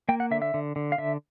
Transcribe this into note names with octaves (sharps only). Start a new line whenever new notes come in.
A#3 G5
F#5
D3 E5
E5
D3
D3
F5
D3 E5